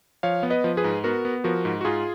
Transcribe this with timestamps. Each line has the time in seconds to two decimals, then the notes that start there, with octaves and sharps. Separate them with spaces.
0.23 F3 C#5 F5
0.43 B3
0.50 B4 D#5
0.64 F3
0.77 G#4 B4
0.84 G#2
1.04 B3 F#4 A#4
1.25 B3
1.44 F3 F#4 A#4
1.65 G#2
1.81 F#4
1.85 G#2 F4 G#4